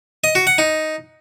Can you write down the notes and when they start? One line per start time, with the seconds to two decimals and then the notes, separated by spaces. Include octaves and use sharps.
0.24 D#5
0.35 F#4
0.47 F#5
0.58 D#4